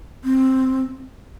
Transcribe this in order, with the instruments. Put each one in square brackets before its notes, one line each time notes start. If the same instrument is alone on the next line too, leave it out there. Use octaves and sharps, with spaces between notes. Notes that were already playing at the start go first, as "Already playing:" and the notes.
[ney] C4